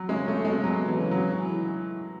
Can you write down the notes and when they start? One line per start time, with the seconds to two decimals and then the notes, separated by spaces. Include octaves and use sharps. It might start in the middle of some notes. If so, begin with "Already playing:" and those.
Already playing: F#3
0.09 C#3 G#3
0.27 C#3 A3
0.45 B2 G#3
0.55 C#3
0.64 B2 F#3
0.87 E3
0.98 C#3
1.11 F#3
1.34 E3